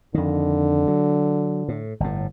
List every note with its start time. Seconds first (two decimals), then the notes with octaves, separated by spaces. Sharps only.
0.14 F2 D3 D#3
0.88 F#3
1.68 A2
2.00 G1 A2